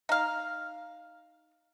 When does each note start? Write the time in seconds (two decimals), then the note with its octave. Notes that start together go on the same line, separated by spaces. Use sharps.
0.09 D#4 F5